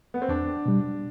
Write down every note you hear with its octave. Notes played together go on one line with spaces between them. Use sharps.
B3
C4
E2 D4
B2 G3